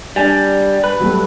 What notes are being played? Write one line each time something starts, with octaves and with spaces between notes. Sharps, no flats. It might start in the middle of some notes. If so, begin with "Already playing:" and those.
G3 D4 G#5
B4
F#3 G3 A3